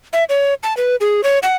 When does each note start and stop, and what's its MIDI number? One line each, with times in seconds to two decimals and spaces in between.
0.13 0.24 76
0.29 0.54 73
0.63 0.76 81
0.77 0.96 71
1.01 1.23 68
1.24 1.39 73
1.43 1.56 78